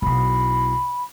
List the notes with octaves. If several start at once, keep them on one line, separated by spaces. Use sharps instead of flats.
B1 E4 B5